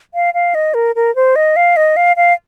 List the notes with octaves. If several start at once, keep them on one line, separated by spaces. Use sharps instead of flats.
F5
F5
D#5
A#4
A#4
C5
D#5
F5
D#5
F5
F5